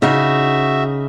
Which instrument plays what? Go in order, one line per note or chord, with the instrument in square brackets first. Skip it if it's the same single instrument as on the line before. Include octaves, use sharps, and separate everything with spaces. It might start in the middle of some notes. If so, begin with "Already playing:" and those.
[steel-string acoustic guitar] C#3 D#4 [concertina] F#4 E5